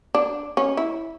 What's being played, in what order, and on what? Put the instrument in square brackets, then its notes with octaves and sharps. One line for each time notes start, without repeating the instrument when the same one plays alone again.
[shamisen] D4
C#4
E4